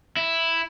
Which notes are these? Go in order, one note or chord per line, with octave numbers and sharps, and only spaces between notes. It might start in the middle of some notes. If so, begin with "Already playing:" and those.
E4